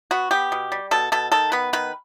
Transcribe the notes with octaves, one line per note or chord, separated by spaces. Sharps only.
B3 F#4
B3 G4
B2
G3
B2 A4
B2 A4
D#3 A4
B3 B4
D#3 B4